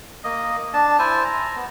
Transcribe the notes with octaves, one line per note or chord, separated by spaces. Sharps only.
A#3 D#5
D4 A5
E4 C5 G#5 A5
A#5
B3